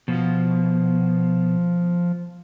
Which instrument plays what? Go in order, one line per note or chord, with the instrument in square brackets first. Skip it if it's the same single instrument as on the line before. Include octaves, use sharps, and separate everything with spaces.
[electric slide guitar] B2 [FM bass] F3